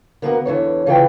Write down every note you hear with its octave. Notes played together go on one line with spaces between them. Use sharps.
D3 A#3 B3 F#4 G#4 A#4
E2 D3 E3 C#5
C#3 E3 F4 B4 E5 G5